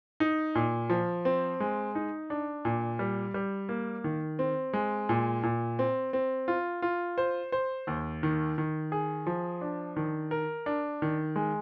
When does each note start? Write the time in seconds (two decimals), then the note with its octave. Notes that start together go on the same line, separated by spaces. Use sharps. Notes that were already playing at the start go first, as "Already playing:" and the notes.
0.20 D#4
0.55 A#2
0.90 F3
1.25 C4
1.60 G#3
1.95 D#4
2.30 D4
2.65 A#2
2.99 G3
3.34 G3
3.69 A#3
4.04 D#3
4.39 C4
4.73 G#3
5.09 A#2
5.43 A#2
5.79 C4
6.13 C4
6.48 F4
6.82 F4
7.18 C5
7.52 C5
7.87 D#2
8.23 D#3
8.58 D#3
8.92 G#4
9.27 F3
9.61 D4
9.96 D#3
10.31 A#4
10.66 D4
11.02 D#3
11.36 G#3